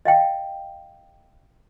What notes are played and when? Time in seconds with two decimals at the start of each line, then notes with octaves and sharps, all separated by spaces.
0.05 D#5 F5 G5